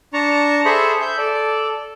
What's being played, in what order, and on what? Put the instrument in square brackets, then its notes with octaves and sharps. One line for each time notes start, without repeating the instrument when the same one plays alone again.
[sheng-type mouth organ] D4 A5 A#5 C#6
G#4 A4 C5 E5 B5 C#6
E5 G6
A4 D5